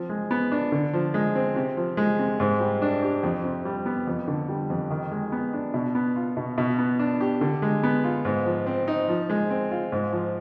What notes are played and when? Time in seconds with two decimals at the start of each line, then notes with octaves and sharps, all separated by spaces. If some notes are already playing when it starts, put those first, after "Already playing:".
Already playing: F3 C4
0.09 G#3
0.31 B3
0.52 D4
0.72 D3
0.93 F3
1.14 G#3
1.35 C4
1.56 C3
1.77 F3
1.97 G#3
2.19 C3
2.40 G#2
2.60 G3
2.82 D4
3.03 G4
3.23 F2
3.44 C3
3.65 G3
3.86 B3
4.07 F2
4.28 D3
4.49 G3
4.70 F2
4.90 D#3
5.11 G#3
5.32 B3
5.53 D4
5.74 B2
5.95 B3
6.16 F4
6.37 B2
6.58 B2
6.79 B3
6.99 D4
7.21 G4
7.41 D3
7.62 G#3
7.83 B3
8.04 F4
8.25 G#2
8.46 F3
8.67 C4
8.88 D#4
9.09 F3
9.30 G#3
9.50 C4
9.71 F4
9.92 G#2
10.12 F3